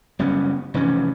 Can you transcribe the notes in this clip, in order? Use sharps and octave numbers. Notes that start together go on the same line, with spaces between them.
F#1 G3 B3 C#4
F1 G2 E3 C#4